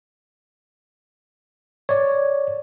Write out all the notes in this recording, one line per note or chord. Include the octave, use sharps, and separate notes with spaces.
C#5 D5